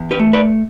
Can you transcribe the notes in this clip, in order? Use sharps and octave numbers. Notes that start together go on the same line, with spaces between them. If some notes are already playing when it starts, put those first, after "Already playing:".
Already playing: E2
G4 B4
A3
B4 D5